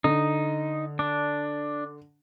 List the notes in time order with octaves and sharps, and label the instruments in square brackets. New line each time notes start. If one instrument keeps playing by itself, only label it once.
[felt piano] D3 [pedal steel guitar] D#4
[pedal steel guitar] D4